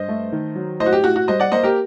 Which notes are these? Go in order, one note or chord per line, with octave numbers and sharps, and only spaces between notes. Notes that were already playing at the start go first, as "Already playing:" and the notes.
Already playing: G2 C5 D#5
A3
D#3
F#3
A2 C5 D#5
F#4
G4
A2 F#4
F#4
G3 C5 D#5
D5 F#5
A#3 C5 D#5
G4 A#4